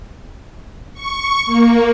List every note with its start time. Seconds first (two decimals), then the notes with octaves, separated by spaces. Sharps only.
0.94 C#6
1.46 A#3